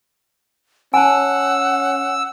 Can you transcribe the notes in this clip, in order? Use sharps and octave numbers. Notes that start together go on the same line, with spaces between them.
C#4 F#5 G#5 A5 E6